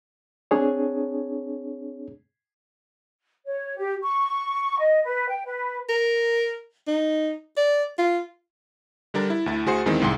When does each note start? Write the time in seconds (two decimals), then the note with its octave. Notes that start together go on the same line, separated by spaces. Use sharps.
0.51 C4 D4 G#4 C#5
3.45 C#5
3.77 G4
4.03 C#6
4.79 D#5
5.04 B4
5.28 G5
5.45 B4
5.89 A#4
6.87 D#4
7.57 D5
7.98 F4
9.14 D3 G3 D4 A#4 A6
9.30 E4
9.46 D2 E4 A6
9.66 D2 F#4 G#4 C5 C7 C#7
9.86 E2 D#3 G#3 C4 E4
10.02 C2 G#2 G#3 G5 C6